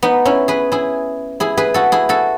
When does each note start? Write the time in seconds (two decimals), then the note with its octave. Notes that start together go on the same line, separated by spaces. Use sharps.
0.03 B3 D#4
0.25 C#4 E4
0.48 G#4 B4
0.72 E4 G#4
1.40 E4 G#4
1.57 G#4 B4
1.74 F#4 A4
1.92 E4 G#4
2.09 F#4 A4